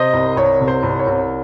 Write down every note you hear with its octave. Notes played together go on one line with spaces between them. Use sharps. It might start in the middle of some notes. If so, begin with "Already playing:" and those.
Already playing: C3 C5 D#5
C2
C2 C#5
C3
C5
C2
C#5
C2